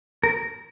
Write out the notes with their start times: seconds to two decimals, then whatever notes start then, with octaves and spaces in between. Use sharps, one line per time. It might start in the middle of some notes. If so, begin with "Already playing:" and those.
0.23 A#4